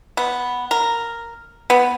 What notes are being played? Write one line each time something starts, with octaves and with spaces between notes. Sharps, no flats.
B3
A#4
B3